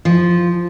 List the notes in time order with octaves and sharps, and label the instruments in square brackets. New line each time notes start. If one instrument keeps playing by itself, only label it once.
[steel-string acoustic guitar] F3